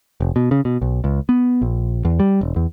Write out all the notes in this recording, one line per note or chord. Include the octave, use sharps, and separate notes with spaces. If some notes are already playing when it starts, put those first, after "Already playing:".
F1
B2
C#3
B2
B1
C#2
B3
A#1
E2
G3
E1
E2